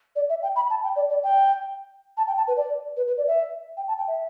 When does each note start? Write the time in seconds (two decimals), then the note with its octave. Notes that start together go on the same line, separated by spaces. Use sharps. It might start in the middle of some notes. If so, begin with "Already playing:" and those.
0.16 D5
0.29 E5
0.43 G5
0.56 B5
0.70 A5
0.83 G5
0.96 D5
1.10 D5
1.23 G5
2.17 A5
2.27 G5
2.37 A5
2.48 B4
2.57 D5
2.97 B4
3.07 B4
3.18 D5
3.27 E5
3.77 G5
3.88 A5
3.98 G5
4.08 E5